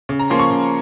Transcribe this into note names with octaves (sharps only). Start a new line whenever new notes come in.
C#3
A#5
F3 A#3 C#4 C6
C#6
C#3